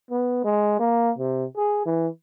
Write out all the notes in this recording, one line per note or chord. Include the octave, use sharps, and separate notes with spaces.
B3
G#3
A#3
C3
G#4
E3